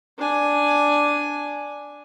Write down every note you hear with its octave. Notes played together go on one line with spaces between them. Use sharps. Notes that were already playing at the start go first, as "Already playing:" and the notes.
D4 G#5